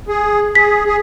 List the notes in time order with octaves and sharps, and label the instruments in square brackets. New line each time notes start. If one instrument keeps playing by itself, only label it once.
[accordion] G#4
[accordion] G#4 [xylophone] B6
[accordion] G#4